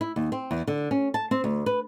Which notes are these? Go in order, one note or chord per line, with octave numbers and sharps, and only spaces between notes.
E4
D#2
C4
E2
D3
C#4
A5
C4
D2
B4